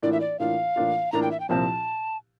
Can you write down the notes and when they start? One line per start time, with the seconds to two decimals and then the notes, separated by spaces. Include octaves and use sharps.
0.02 A2 E3 A#3 D4 F4 D5
0.13 E5
0.20 D5
0.39 A2 E3 A#3 D4 F4 F5
0.76 A2 E3 A#3 D4 F4
1.12 A2 E3 A#3 D4 F4 A#5
1.23 G5
1.31 E5
1.40 G5
1.49 C2 A#2 F3 C4 A5